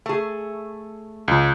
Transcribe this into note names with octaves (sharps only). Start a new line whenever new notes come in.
A3 G#4
C#2